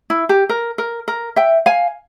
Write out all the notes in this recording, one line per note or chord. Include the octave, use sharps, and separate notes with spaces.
E4
G4
A#4
A#4
A#4
E5 G5
F5 G#5